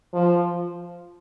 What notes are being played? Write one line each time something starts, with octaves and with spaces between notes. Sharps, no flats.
F3